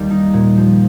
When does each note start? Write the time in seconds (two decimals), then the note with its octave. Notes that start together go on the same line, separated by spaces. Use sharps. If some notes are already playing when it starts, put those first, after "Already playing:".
Already playing: D#2 D#3 G3
0.11 D#4
0.33 A#2
0.58 F3